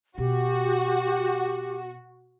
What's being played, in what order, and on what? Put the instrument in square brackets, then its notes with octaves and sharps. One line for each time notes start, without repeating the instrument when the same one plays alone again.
[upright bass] B2 [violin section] F#4 [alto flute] G4